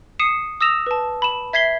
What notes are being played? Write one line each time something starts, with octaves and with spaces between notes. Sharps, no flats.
D#6 C7 C#7 D#7 E7
D#6 E6 A#6 E7 F7
B4 A5
B5 E7
E5 G#6 B6 C7 G7